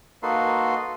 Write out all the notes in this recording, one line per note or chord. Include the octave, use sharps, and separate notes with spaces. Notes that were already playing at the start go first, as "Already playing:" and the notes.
A#3 D#4 F#4 A4 B4 C6